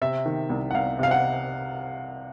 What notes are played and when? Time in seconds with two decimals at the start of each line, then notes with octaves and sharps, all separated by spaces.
0.02 C3 E5
0.26 D#3
0.50 C2
0.71 F#5
0.74 C2 F5
0.99 C3 F5
1.11 F#5